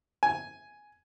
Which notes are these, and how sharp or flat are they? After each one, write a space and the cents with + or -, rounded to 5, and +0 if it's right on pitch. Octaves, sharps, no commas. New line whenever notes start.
G#5 +5